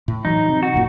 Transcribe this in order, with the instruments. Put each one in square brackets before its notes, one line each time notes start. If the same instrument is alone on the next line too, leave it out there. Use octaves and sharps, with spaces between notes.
[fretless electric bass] A2
[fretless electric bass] E3 F#3 [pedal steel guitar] D#4
[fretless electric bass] C3
[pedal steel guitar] F#4
[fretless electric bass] F#1 F#2 A#2